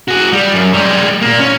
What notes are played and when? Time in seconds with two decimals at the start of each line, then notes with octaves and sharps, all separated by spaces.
0.08 F#4 G#4
0.32 G3
0.54 F#2
0.73 G3 G#3
1.22 A#2 A#3
1.39 C#4